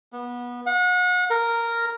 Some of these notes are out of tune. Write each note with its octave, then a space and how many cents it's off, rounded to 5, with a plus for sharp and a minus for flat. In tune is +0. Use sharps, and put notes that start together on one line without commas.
B3 -20
F#5 -35
A#4 -5